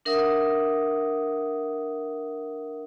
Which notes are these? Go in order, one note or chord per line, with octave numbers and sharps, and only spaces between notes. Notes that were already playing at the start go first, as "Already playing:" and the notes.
D4 A#4 E5 F#5 D#6